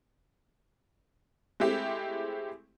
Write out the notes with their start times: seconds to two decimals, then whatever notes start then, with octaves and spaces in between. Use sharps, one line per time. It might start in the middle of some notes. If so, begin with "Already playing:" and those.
1.60 G#3 A3 C4 E4 G4